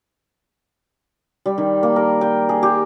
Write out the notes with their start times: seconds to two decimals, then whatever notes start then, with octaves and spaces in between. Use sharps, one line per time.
1.46 G3
1.58 D#3
1.83 A#3
1.96 A#4
2.21 G5
2.49 G#4
2.63 G4